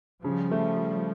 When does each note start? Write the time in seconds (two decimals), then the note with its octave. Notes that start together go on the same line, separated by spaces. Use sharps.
0.24 C#3 F3 G3
0.51 A3